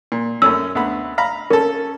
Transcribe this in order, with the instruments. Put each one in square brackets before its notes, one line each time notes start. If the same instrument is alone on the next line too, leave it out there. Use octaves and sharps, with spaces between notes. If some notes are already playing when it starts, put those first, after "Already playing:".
[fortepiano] A#2
[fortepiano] F#2 A3 C#4 [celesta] E6
[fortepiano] D2 B3 B5
F5 A#5 B5
[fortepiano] C#4 A4 [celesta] A#4